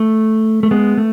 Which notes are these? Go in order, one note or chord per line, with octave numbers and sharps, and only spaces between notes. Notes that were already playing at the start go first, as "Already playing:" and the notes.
Already playing: A3
A3
G#3 B3
A3